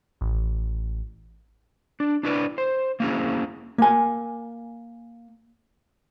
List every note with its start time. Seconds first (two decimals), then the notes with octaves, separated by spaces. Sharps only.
0.21 A1
2.00 D4
2.23 D4 E4 B4 D5
2.58 C5
3.00 A#3 C4 C#4 E4 G#4
3.78 A#3 G#5